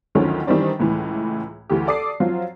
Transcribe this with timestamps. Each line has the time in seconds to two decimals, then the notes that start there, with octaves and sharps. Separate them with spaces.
0.15 D2 D3 D#3 F3 F#3 C#4
0.47 D#3 E3 G3 C4 D4
0.79 C#2 A2 E3
1.70 D2 E3 G4
1.87 A4 D5 D6 D#6 C7
2.20 F3 F#3 C4 F4